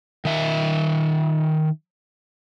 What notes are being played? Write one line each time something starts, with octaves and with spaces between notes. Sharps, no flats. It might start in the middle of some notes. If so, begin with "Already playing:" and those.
D#3 E5